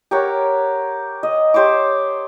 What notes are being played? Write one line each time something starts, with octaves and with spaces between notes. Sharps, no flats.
G4 A#4 C#5 F#5
D#5
G4 C5 C#5 D6